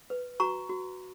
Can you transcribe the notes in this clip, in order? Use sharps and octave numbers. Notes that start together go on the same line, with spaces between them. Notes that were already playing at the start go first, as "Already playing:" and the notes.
B4
F#4 A#5 C#6
F#4